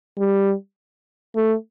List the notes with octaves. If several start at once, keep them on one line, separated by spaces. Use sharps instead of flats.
G3
A3